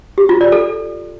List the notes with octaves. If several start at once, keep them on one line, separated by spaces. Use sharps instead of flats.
G4
F4
D5
A4